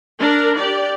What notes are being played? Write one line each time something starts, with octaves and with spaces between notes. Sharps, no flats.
D4 A#4
G4 D5